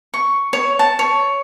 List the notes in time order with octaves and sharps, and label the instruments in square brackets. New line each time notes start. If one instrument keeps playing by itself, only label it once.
[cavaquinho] C#6
C#5
A5
C#5